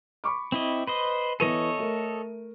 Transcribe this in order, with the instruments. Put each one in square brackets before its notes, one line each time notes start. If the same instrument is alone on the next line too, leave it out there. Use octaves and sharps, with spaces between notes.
[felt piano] B5 C#6 D6
[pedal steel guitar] C4 E4 D#5
B4 C5 D#5
[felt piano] E3 B3 D#7 [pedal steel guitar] A4 C#5 D#5
[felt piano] A3 A#4